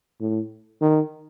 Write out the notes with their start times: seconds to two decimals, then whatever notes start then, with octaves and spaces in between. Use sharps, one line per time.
0.21 A2
0.82 D#3